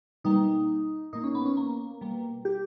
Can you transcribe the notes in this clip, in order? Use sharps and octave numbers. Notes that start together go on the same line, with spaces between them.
B2 G3 A#3 D#4
A#2 A#3 D#4
C#4
B3
C#4
A#3
B2 G3 A#3
G4